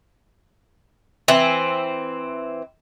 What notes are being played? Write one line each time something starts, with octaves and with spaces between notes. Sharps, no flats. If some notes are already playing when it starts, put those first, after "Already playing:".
E3 C4